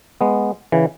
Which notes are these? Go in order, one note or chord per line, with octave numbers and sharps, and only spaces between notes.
G#3 B3
C#3 E3